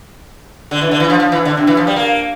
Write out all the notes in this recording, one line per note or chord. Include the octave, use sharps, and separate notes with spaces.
D3
E3
D3
E3
F3
F3
E3
D3
C3
E3
F3
G3
A#3